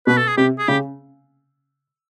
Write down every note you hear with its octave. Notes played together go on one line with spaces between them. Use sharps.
B2 B4
A4
G#4
C3 G4
G#4
C#3 G4